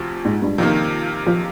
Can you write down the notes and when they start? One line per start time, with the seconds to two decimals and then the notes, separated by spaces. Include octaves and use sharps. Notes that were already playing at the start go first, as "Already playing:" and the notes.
Already playing: D2 C3 F3
0.25 G#2
0.42 G2
0.58 C3 D#3 F3 A#3
1.26 F3